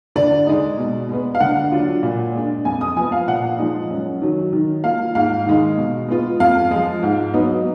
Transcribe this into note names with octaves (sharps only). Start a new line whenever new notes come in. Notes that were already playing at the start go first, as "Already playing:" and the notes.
D3 D5
G#3 D#4
B2
G#3 B3
F5
D3 F#5
F#3 D4 F4
A#2
G#3 D4
F2 G#5
D#6
F3 B3 G#5
F5
A#2 F#5
F3 G#3 D#4
F#2
D#3 F#3
D#3
A#3 F4 F5
G#2 F5
D#3 G#3 D#4
B2
G#3 B3 F4
F2 F5
F3 G#3
G#2
F#3 B3 D#4